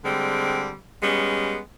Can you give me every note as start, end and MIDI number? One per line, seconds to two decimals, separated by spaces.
0.04 0.75 50
0.04 0.75 55
0.04 0.75 56
0.04 0.75 60
1.03 1.59 55
1.03 1.59 56
1.03 1.59 59
1.03 1.59 61